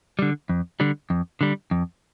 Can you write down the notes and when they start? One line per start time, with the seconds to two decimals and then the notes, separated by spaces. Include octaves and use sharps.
0.19 D3 G3
0.49 F2
0.80 D3 G3
1.10 F2
1.41 D3 G3
1.71 F2